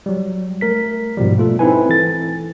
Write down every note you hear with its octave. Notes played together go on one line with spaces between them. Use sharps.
F#3 G3
A3 A#4 B6
G#2 B2 F3 G3
A3 F4 A4
C4 D#4 E4 B4 G#5
E3 A4 A6